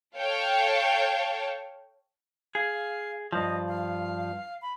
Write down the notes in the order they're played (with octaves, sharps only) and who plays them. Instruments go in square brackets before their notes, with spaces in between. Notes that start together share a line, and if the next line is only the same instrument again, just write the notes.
[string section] A4 C#5 F5 G5 A5
[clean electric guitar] G#4 [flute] F5
[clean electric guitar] G2 F3 [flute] D#5
[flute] F5
B5